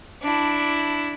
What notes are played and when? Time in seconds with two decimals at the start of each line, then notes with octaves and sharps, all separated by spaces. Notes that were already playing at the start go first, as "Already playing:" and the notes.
0.22 D4 E4